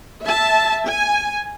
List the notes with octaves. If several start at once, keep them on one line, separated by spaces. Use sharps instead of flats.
E5 A5
G#5